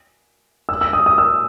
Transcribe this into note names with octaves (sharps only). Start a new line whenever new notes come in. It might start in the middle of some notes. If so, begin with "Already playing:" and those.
E6
E6
D#6
D#6
E6